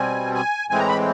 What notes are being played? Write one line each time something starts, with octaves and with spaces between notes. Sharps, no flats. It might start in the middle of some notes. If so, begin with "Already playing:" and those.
Already playing: B2 G3 C4 G#5
G#5
A2 E3 G#3 C4 G#5
A#5
B5